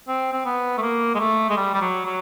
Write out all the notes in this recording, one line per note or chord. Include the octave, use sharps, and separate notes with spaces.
C4
C4
B3
A3
A#3
G#3
A3
G#3
G3
G3
F#3
F#3